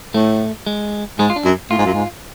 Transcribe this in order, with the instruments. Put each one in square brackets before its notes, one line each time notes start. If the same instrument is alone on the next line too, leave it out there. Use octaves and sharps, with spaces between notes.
[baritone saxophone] A2 [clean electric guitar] A3
[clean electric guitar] G#3
[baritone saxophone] G#2 [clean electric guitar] G#3
[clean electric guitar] F4
D4
[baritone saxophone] F#2
[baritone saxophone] A2 [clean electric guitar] F4
[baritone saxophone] G#2
F#2
G#2